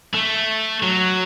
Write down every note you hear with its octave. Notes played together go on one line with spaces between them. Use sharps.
A3
F#3